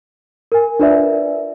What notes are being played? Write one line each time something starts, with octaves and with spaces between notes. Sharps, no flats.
A#4 G#5
D4 F4 A#4 B4 D5 E5